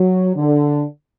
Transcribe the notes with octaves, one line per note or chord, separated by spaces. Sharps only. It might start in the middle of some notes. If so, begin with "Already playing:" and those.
Already playing: F#3
D3